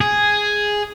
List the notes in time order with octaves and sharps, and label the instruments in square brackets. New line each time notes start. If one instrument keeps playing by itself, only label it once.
[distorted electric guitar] G#4